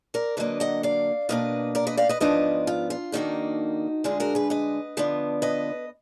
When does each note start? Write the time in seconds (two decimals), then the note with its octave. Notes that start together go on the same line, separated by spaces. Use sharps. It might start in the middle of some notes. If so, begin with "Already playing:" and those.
0.14 A#4 D5
0.37 D3 F#3 A#3 D4 B4 D#5
0.60 D#5 F#5
0.83 D5 F5
1.29 B2 A#3 D4 B4 D#5
1.75 A#4 D5
1.87 B4 D#5
1.97 D5 F5
2.09 B4 D#5
2.20 G#2 F3 B3 D4 B4 D#5
2.67 F4
2.90 F4
3.12 F2 D#3 A#3 D4 D#4 F#4
4.04 D2 D3 G#3 D4 F4 G#4
4.20 F#4 A#4
4.35 G#4 B4
4.50 B4 D#5
4.97 D3 F3 B3 D4
5.42 B4 D#5